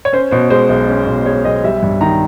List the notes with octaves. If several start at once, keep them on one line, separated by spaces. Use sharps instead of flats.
C#5
C#4 C5
B2 C5
G#3 C5
B1
C#4
B2
G#3 C#5
B1 D#5
G3 E5
G2
D#3 A#5